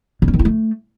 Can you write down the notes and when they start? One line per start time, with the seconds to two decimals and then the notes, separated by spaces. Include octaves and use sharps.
0.22 C#3
0.28 C#4
0.34 D#3
0.39 E4
0.45 A3